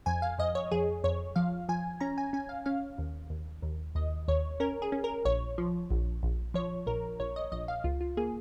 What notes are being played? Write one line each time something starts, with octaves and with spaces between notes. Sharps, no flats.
F2 G#5
F5
F2 D#5
C#5
F2 G#4
F2 C#5
F3 F5
F3 G#5
C#4 A#5
G#5
C#4 G#5
F5
C#4 F5
D#2
D#2
D#2
D#2 D#5
D#2 C#5
C#4 A#4
G#4
C#4
A#4
A#1 C#5
F3
A#1
A#1
F3 C#5
A#1 A#4
A#1 C#5
D#5
A#1 D#5
F5
C#2 F4
F4
A#3 G#4